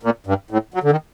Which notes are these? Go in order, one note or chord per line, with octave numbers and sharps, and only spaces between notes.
A#2
G2
A2
F#3
D3
D#3